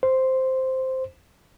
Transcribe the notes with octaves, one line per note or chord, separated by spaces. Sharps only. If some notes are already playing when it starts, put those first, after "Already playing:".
C5